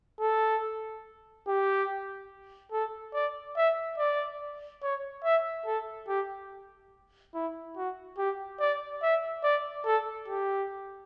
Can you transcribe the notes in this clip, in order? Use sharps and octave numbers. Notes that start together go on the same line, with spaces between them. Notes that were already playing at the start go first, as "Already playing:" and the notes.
A4
G4
A4
D5
E5
D5
C#5
E5
A4
G4
E4
F#4
G4
D5
E5
D5
A4
G4